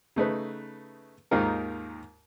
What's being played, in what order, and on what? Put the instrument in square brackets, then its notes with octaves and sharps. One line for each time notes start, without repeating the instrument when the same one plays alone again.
[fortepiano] C#3 A3 D#4 B4
D#2 G#2 D#3 D#4 F4 A#4